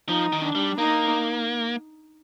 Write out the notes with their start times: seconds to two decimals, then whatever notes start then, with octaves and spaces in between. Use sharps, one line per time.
0.09 F3 D#4
0.33 D#3
0.43 D4
0.55 G3
0.78 A#3 D#4